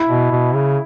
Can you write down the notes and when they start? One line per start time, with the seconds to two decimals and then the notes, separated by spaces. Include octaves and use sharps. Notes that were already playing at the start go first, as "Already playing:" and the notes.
Already playing: E4
0.08 B2
0.32 B2
0.54 C#3